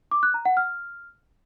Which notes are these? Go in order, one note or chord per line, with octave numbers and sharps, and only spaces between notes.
D6
F#6
A#5
F#5
F6